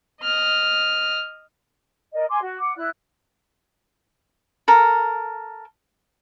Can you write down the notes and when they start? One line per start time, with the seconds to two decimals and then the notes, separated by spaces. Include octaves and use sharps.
0.23 D#5 F6
2.13 A#4 D5 D#5
2.29 G#5 C6 D6
2.41 F#4
2.58 F#5 D6
2.76 E4 D5 F#6
4.68 A4 A#4